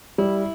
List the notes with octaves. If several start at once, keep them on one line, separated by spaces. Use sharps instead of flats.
G3 E4